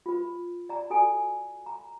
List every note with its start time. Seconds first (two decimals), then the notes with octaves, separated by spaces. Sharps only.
0.06 F4 B4
0.69 D5 A#5
0.90 F#4 A4 D5 G#5
1.66 A#5